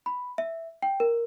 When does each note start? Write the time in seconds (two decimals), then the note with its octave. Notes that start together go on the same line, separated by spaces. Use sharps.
0.06 B5
0.38 E5
0.82 G5
1.00 A#4